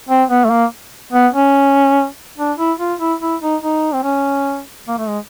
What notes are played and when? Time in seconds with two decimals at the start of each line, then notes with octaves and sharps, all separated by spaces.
0.09 C4
0.29 B3
0.45 A3
0.50 A#3
1.13 B3
1.34 C#4
2.38 D4
2.58 E4
2.79 F4
3.00 E4
3.21 E4
3.42 D#4
3.62 D#4
3.94 C4
4.04 C#4
4.88 A#3
4.98 A3
5.09 G#3